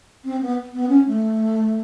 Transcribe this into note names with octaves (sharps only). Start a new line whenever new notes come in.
C4
B3
B3
C#4
A3